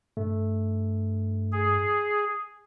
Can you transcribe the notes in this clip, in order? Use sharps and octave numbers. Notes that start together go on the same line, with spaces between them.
G2 A3
G#4